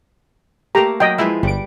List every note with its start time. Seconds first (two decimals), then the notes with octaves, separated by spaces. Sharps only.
0.75 A3 A#3 G4 A#5
1.00 F#3 D#5 G5
1.18 F3 G#3 E4 B4
1.43 G1 G3 D7